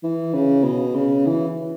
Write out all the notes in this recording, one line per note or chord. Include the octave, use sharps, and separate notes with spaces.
E3
C#3
B2
C#3
E3